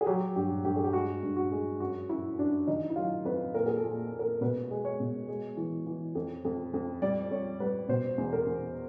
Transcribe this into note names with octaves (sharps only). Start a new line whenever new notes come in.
G#4
F#3 G4
G2 G4
G2 G4
G#4
G4
G#3 F#4
G2
F#4
G#3
F#2 F#4
F#2 E4
F#2 D4
D#3 D#4
E4
F#3 F4
F2 B4
A#2 A#4
G#4
A4
A#2
A#2
A#4
B2 B4
G#3
C#5
B2
G#3
E3
E3
F2
F2
F2
G3 D5
F2 C#5
G3 B4
B2 C5
E2
A#4
E2